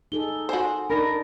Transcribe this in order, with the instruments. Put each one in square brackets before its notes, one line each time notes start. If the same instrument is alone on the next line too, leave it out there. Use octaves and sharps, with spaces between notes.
[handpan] D#4 G#4 A4 [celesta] G7
[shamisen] F#4 C5 [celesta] G#5
[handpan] D4 D#4 [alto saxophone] A#4 [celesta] B5 A#6